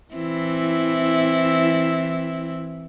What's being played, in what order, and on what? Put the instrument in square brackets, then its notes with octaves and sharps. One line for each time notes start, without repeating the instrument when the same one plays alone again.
[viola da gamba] E3 C4 E4